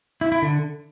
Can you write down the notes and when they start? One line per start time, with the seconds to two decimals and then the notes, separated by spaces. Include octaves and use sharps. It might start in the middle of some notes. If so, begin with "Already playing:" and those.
0.21 E4
0.32 E4
0.42 D3